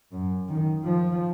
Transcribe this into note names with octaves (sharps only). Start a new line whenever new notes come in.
F#2
D#3
F3